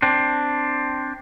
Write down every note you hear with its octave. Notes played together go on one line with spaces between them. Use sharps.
C4 D4